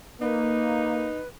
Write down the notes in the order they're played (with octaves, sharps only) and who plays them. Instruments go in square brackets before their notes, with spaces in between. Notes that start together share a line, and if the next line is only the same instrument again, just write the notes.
[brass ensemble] A#3 [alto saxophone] D#4 [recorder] B4